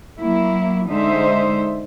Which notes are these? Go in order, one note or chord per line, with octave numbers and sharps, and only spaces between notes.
F#3 A#3 E4
D3 G#3 D#4 C5 E5